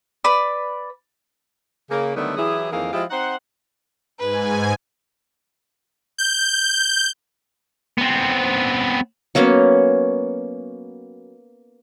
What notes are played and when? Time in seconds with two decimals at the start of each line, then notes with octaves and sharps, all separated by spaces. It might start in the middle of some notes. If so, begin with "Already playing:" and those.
0.24 B4 D5
1.90 C#3 A#3
2.16 D3 D#3 F#3 G3 A3 B3
2.37 E3 F#3 E4 G4 G#4
2.72 F2 D#3 E3 A#3 G#4 F5
2.92 F3 G#3 E4 F4 G4 D#5
3.11 C4 D#4 C5 F#5
4.20 G#2 B4 G#5
6.18 G6
7.98 B3 C4
9.35 F#3 A#3 B3 C#4